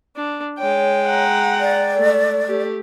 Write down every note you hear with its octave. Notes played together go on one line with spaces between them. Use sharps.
D4
G#3 C#5 G5
F#5 A#5
D5
A3
A3 G4